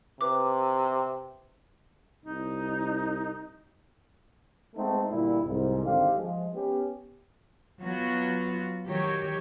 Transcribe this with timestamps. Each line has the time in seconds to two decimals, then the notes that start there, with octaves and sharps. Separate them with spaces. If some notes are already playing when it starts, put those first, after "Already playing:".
0.21 C3 B4 D6
2.25 C2 D#4
4.76 G#3 A3 B3 C4 D#4 A4
5.10 G1 A#2 G3 E4
5.45 C2 G#2
5.85 G#1 D3 D#3 C4 G4 F5
6.17 F3 G#3
6.54 B3 C#4 G4
7.82 F#3 B3 F4 F#4
8.85 D#3 F#3 G4 C#5